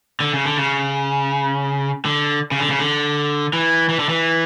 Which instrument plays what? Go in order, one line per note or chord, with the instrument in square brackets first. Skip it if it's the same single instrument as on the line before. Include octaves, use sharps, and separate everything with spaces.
[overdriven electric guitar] D3
C#3
D3
C#3
D3
C#3
D3
C#3
D3
E3
E3
D3
E3